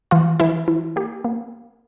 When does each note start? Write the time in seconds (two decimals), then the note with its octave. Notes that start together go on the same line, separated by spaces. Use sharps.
0.11 E3 F4
0.40 E3 E4
0.68 E3 E4
0.96 A#3 G4
1.24 A#3